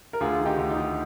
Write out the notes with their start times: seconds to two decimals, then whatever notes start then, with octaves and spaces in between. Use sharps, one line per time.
0.13 A#4
0.20 D2 F4 G#4
0.39 D#3
0.45 D#4 G4
0.58 D2
0.70 D#4
0.76 D2